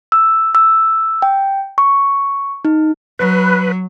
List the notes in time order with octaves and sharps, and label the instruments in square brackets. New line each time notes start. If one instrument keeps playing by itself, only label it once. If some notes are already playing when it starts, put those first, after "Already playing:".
[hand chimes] E6
E6
G5
C#6
D#4
[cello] F#3 [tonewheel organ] B4